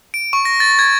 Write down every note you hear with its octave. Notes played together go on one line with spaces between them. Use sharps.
D7
C#6
A#6
A6
G#6